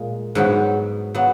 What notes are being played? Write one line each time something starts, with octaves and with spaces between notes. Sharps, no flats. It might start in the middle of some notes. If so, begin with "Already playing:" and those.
Already playing: A#2 G#3
G#2 F#3 B3
F#3 B3